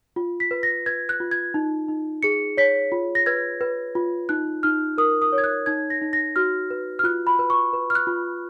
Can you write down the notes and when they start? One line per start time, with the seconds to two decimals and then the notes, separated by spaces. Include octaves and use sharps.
0.16 F4
0.40 B6
0.51 B4
0.63 A#6
0.86 B4 G#6
1.09 F#6
1.20 F4
1.31 G#6
1.54 D#4
1.88 D#4
2.23 G#4 C#7
2.57 C#5 B6
2.92 F4
3.15 A#6
3.26 B4 G#6
3.61 B4
3.95 F4
4.29 D#4 F#6
4.63 D#4 F6
4.98 A#4 D#6
5.22 D#6
5.32 C#5
5.38 G#6
5.44 F#6
5.66 D#4 G#6
5.90 A#6
6.02 D#4
6.13 A#6
6.36 F#4 F6
6.71 B4
6.99 F6
7.04 F4 F#6
7.27 B5
7.39 B4
7.50 C#6
7.73 B4
7.90 F6
7.95 F#6
8.07 F4